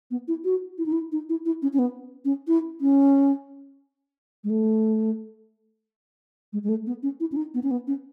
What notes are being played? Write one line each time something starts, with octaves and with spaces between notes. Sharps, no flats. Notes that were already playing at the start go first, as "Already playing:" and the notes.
B3
E4
F#4
E4
D#4
E4
D#4
E4
E4
C#4
C#4
B3
C#4
E4
C#4
G#3
A3
G#3
G#3
A3
B3
C#4
E4
C#4
D#4
B3
C#4
B3
C#4